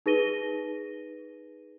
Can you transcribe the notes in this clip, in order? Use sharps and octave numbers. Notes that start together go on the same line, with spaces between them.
D#4 G#4 B4 A#6 D#7 G7